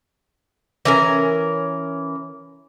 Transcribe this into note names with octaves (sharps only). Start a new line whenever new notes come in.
E3 C#4 A#4